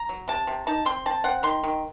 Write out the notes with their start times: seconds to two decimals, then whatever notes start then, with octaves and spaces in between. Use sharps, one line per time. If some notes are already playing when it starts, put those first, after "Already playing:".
Already playing: A#5
0.09 F#3
0.28 C3 A5
0.47 C3
0.67 D#4 A5
0.85 C4 C6
1.06 C4 A5
1.24 C4 F#5
1.43 D#3 C6
1.63 D#3